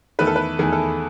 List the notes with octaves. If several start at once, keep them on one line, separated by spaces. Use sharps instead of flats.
E2 D#3 A3 B4
A4
B4
E2 D#3 A3 G#4
A4